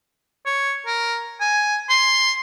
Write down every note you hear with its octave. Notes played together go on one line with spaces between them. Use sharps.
C#5
A#4
G#5
C6